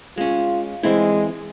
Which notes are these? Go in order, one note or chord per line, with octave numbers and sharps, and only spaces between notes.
G#3 C#4 F4
E3 G#3 C4 E4